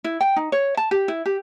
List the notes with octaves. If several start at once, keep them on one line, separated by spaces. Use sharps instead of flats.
E4
G5
D#4
C#5
A5
G4
E4
G4